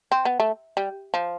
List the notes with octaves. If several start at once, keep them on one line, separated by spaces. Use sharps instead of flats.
C4
B3
A3
G3
F3